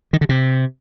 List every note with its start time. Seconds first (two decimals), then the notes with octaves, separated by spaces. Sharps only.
0.13 D#3
0.21 D3
0.29 C3